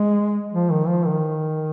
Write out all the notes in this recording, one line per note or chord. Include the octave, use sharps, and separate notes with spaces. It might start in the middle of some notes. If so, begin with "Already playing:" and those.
Already playing: G#3
F3
D#3
F3
D#3